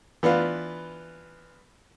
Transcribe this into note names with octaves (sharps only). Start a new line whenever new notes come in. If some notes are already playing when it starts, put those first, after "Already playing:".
E3 B3 D4 F4